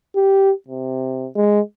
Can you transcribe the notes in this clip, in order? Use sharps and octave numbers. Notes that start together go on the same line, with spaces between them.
G4
C3
G#3